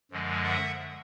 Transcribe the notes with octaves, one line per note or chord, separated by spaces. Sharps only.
F#2 D3 F3 G#3
E5 F#5